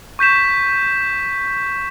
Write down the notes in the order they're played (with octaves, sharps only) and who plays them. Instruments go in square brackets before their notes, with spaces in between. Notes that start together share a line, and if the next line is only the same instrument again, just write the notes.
[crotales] C#6 G6 B6 E7